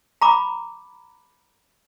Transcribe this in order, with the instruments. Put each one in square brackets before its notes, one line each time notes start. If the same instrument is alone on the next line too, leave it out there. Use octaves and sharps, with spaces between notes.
[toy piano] A#5 B5 D6